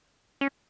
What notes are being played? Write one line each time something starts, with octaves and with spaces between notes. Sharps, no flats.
C#4